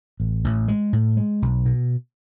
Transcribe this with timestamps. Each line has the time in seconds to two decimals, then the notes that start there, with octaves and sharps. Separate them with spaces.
0.20 A1
0.44 A1
0.68 G#3
0.93 A2
1.17 G#3
1.42 B1
1.66 B2